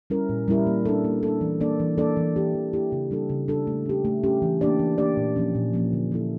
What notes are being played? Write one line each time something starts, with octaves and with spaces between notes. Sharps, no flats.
G3 C#4 E4 A#4
A#2
G3 C#4 E4 A#4
A#3
D4 A4
A#3
D4 A4
E3
A#3 D4 A4 D5
E3
A#3 D4 A4 D5
E3
A#3 E4 G4
E3
A#3 E4 G4
C#3
G3 D4 A4
C#3
G3 D4 A4
A3
C#4 G4
A3
C#4 G4
E3
A#3 D4 G4 D5
E3
A#3 D4 G4 D5
A#2
F3 A#3 C#4
A#2
F3 A#3 C#4
D3
F3 A#3 E4 A4